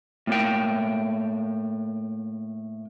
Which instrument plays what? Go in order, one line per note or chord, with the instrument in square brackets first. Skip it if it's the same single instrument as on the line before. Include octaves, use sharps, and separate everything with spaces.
[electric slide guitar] A2 A#3 G5